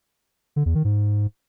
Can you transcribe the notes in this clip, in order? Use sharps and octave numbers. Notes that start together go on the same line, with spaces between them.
D3
E2
D#3
G#2